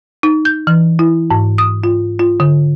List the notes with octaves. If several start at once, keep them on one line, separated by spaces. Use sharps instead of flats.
D#4
G6
E3
E4
G#2
D#6
F4
F4
D3